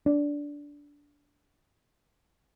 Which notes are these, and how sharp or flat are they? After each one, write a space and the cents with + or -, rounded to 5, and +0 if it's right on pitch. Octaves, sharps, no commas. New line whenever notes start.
D4 -15